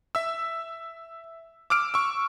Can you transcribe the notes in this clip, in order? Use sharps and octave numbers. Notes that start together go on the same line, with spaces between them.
E5 E6
D6 E6 F6 D7
C#6 E6